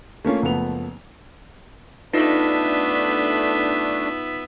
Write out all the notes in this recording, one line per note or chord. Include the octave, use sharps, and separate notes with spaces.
A3 A#3 C#4 F4
F#1 F3 A3 B3 F7
A3 B3 D4 D#4 F4 B4 E5